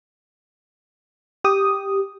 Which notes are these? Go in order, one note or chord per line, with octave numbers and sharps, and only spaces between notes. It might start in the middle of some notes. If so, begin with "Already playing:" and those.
G4 D#6